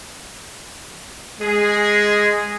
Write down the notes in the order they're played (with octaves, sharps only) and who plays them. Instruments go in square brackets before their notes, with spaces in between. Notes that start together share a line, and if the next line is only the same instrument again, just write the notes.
[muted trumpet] G#3 [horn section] G#4